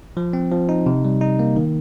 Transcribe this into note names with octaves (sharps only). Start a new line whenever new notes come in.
F3
C4
F3
D#4
C3
G3
D#4
A#3
D#3